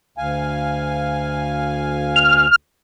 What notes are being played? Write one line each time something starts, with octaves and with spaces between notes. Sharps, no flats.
D2 F5 G#5
F6